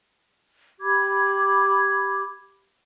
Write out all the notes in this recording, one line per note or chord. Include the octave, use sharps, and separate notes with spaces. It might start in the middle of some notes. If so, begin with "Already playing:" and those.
G4 B5 D6 G#6